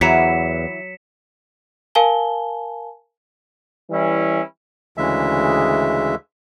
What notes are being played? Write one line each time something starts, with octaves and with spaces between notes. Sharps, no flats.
E2 E3 F#3 E4 A#5 B6 C#7 E7
A#4 F5 G#5 A5 G7
E3 G3 C#4 E4
D2 C#3 E3 G#3 E5